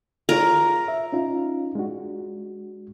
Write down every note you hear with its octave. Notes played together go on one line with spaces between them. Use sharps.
F4 G#4 A#4 C#5
E5
C#4 D#4 F4
G#3 D4 F#4